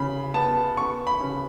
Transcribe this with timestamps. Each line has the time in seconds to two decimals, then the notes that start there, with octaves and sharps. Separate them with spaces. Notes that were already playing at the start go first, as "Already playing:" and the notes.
Already playing: C#3 B5
0.34 B3 A5
0.77 B3 C#6
1.07 B5
1.21 C#3